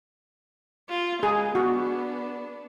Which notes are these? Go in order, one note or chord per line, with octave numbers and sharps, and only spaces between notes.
F4
G#3 G#4
B3 D4 F#4